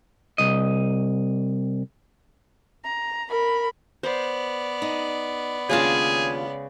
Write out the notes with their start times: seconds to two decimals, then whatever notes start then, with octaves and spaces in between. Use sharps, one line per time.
0.38 C2 D#5
2.84 A#5
3.30 A#4 B5
4.03 B3 C5 D5
4.82 D#4
5.70 D#2 C#3 G#3 D4 F4 G#4 A5